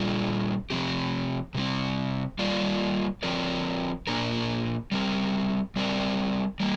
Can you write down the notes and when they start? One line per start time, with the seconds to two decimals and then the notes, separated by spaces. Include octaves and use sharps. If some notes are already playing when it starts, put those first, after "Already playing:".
Already playing: A#2 G3 D4 F4
0.70 C3 F3 C4 G4
1.55 C3 G3 C4
2.39 G3 A#3 F4 D5
3.23 F3 C4 A#4 D5
4.07 A#2 A#3 D4 A#4
4.92 G3 C4 A#4
5.76 G3 C4 A#4 D5
6.60 G3 A#3